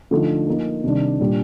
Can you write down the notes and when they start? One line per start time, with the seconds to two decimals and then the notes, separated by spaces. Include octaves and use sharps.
0.11 D3 F3 A3 D#4
0.47 F3 A#3 D#4
0.84 C3 D#3 G3 D4
1.20 A#2 G3 D4